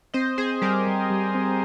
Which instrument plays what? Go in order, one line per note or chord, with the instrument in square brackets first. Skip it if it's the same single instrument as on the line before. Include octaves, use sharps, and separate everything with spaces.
[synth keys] C4 [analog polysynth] C5 D#5
[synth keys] C4 [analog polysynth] G#4 C5
[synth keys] G3 [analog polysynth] G4 A#4
[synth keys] G3
G3
C4